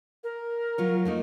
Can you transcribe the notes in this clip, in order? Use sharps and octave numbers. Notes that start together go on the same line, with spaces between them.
A#4
F#3 F4 C#5
A3 A#3 D#4